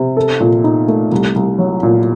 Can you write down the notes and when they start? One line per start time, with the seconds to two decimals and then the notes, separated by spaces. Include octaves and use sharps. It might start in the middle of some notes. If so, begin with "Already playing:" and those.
Already playing: C3
0.17 A4
0.40 A#2
0.64 D#4
0.88 A3
1.12 C2
1.35 C2
1.59 F#3
1.83 A#2